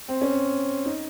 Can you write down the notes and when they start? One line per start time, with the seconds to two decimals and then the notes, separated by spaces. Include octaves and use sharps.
0.08 C4
0.21 C#4
0.86 D#4